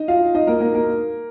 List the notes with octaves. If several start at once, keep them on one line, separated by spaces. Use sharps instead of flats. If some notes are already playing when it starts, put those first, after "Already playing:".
Already playing: D#4 D#5
F4 F5
D#4 D#5
A#3 A#4
A#3 A#4
A#3 A#4